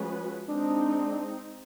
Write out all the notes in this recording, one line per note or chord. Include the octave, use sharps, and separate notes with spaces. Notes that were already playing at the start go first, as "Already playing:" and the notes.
Already playing: F3 G#3 C#4 F#4 B4
G#3 C4 D4 D#4